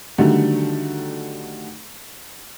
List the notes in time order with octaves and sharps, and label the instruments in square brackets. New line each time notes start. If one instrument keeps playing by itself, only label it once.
[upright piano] D3 D#3 F#3 G3 A3